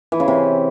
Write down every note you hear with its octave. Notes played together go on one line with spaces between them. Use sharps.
E3
C#3
C3